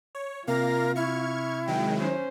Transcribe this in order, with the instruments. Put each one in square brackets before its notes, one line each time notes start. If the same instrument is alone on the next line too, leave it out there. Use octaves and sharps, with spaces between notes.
[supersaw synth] C#5
[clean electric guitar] C3 [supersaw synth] A#3 F5 A#6 [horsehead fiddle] F4 [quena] A#4
[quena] E4 [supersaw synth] C#6 F6 G#6
[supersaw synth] D#3 F#3 G#3 [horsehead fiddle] G5
[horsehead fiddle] C#4 C5